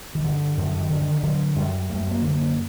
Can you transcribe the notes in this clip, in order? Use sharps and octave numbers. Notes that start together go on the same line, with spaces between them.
D#3
G2 D3
F#2 D3
D#3
D3
D#3
D3 F#3
F#2 G3
F#2 A3
A3
A#3
D3
A3
A#3